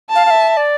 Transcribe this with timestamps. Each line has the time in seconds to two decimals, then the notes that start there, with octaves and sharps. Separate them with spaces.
0.10 A5
0.15 F5
0.26 F5
0.30 E5
0.57 D5